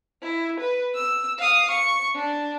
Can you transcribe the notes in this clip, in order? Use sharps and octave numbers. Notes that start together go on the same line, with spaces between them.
E4
B4
E6
F5 D#6
C#6
D4